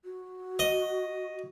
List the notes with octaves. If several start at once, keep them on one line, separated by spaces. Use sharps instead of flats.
F#4
D#5